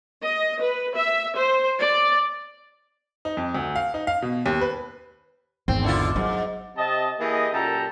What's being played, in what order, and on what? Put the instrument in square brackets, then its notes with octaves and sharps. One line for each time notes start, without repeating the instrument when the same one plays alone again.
[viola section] D#5
B4
E5
C5
D5
[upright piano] D#4
F2
D2
F5
D#4
F5
B2
D#2
B4
[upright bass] G#1 E2 [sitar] C4
[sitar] D3 E4 F4
[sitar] G#2 [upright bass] F#3
[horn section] C3 D#5 A5
E3 A#3 G4 G#4 D#5
F#2 A#2 G4 A4 A5 A#5